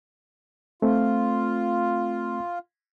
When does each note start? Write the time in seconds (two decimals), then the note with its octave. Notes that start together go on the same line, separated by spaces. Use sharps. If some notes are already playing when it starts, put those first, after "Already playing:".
0.82 A3 C4 F4